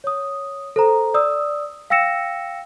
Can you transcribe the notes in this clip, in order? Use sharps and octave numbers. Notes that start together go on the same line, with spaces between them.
C#5 D#6
A4 C5 A#5
D5 D#6 E6
F5 G5 E6 A#6 C#7 E7